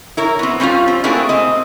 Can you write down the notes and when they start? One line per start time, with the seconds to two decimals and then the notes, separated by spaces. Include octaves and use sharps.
0.17 E4 A#4 C#5
0.39 B3 C4
0.60 G3 C4 C#4 E4 F4
0.88 C4
1.04 A3 A#3 C4 E4 F#4 G#4
1.29 C4 D#5